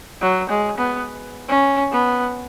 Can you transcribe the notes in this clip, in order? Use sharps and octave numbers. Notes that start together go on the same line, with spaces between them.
F#3
G#3
B3
C#4
B3